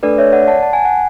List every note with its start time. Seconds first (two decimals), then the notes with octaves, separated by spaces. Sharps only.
0.03 A3 D4 A4 B4 D5
0.18 C#5 E5
0.32 D5 F#5
0.47 F#5 A5
0.63 A5
0.73 G#5
0.85 F#5